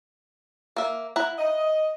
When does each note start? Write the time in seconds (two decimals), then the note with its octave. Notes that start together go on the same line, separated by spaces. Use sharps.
0.76 A#3 E5
1.16 E4 F#5 A#5
1.39 D#5